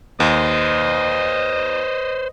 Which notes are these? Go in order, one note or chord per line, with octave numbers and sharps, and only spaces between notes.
D#2 B4 C5 D#5